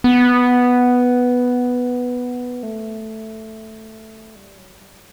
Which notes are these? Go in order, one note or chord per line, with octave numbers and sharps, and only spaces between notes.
B3
A3
G3
F#3
G3